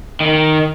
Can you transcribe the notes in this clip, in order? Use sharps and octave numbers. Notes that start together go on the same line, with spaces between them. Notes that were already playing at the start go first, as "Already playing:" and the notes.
D#3